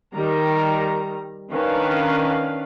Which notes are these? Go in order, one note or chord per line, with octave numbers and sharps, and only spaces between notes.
D#3 G3 A#5
D#3 C#4 D4 B4 F5